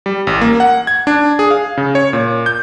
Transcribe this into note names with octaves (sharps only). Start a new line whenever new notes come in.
G3
A1
A#3
F#5
G#6
D4
G#4
F5
C#3
C#5
A#2
G6